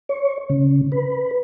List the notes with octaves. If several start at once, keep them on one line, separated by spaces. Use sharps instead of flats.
C#5
C#3
B4